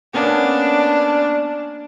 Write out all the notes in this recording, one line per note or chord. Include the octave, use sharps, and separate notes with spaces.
A#3 B3 C#4 D4